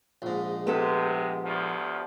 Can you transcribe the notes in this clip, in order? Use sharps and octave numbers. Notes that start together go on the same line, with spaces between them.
A#1 G#2
C3 G#3 B3 G4 A4
A1 D2 F3